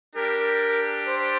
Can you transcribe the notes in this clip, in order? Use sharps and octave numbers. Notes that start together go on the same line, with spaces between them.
G3 D4 G4 A#4
C5